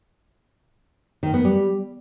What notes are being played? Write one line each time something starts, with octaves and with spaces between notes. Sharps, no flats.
D#3
B3
G3